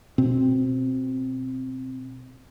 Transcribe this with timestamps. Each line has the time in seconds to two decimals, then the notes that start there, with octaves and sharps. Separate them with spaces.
0.18 B2 C4